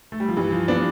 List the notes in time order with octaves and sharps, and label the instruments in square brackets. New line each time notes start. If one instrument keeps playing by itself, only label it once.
[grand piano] A3
G3
F3
[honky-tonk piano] G2 [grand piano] E3
[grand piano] F3
[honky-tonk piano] B3 [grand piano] D4